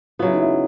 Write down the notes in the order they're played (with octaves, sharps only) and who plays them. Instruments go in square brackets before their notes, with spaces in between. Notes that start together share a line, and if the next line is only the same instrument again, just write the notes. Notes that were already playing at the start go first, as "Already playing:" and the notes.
[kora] B3 [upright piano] F4
[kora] C#3 F#3 [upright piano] E4
[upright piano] D#4
E4